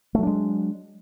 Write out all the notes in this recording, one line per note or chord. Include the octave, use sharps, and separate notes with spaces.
F#3 G#3 A3 D4